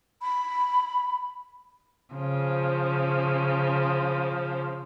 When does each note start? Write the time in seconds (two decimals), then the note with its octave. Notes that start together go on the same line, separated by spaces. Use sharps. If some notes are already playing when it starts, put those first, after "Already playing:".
0.22 B5
2.13 C#3 F3